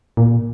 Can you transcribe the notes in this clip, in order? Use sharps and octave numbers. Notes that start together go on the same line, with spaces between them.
A#2